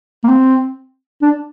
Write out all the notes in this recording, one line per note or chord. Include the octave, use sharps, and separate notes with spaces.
A#3
C4
D4